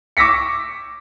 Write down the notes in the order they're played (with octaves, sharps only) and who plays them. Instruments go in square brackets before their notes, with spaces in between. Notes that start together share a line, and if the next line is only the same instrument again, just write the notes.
[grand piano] C#6 D6 E6 A#6 B6 C#7